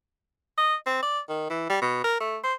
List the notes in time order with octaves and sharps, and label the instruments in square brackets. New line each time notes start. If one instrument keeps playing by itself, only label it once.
[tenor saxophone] D#5
C4
D5
D#3
E3
G3
B2
A#4
A3
C5